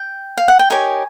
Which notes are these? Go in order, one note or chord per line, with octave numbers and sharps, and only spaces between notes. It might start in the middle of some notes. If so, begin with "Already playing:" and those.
Already playing: G5
F5
F#5
G5
D#4 G4 A#4 C#5 G#5